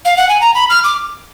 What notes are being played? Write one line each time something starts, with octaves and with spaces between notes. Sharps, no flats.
F5
F#5
G#5
A#5
B5
F6
D6